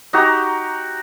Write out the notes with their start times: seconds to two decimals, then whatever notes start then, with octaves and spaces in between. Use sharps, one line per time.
0.13 D#4 F#4 G4 A#5